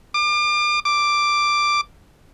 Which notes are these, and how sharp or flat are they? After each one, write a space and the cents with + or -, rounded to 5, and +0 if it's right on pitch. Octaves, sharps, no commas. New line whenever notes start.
D6 +35
D6 +5